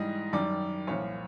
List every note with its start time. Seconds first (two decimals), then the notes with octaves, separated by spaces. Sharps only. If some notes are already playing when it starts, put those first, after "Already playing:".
Already playing: G#2 E3 G3 D#5
0.33 F#2 D#3 G3 D5
0.87 C2 A#2 F3 C#5